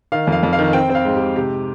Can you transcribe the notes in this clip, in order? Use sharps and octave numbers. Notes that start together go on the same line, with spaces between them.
D#3 F5
F2 F5
F2
F5
D#3
C4 G5
C4
F5
G#2
G4
G#2
C3 G4